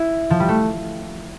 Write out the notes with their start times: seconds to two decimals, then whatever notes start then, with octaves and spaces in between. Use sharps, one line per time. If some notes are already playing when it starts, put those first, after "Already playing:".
Already playing: E4
0.30 F3
0.40 G3
0.48 A3